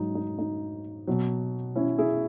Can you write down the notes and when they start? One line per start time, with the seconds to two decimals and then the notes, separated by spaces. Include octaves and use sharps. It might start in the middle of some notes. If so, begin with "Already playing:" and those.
Already playing: G#2 F#3 D#4
0.15 D#4
0.39 D#4
1.07 B2 F#3
1.76 C#4 E4
1.98 E4 G#4